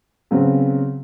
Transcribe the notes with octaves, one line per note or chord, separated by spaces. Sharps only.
C#3 F#3 B3 C4